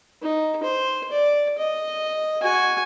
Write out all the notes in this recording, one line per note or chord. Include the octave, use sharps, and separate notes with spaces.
D#4
C5
D5
D#5
F#4 G#5